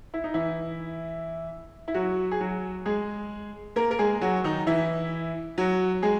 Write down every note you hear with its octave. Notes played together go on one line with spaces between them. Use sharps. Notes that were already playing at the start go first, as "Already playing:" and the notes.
E4
D#4
E3 E4
E4
F#3 F#4
G#4
F#3 F#4
G#3 G#4
A#3 A#4
A#4
G#3 G#4
F#3 F#4
D#3 D#4
E3 E4
F#3 F#4
G#3 G#4